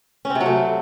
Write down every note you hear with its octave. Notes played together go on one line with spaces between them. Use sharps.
C#4
C4
C3
F#3
A3